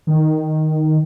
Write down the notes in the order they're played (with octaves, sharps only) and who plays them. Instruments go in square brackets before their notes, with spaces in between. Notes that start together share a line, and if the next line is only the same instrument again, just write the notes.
[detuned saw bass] D#3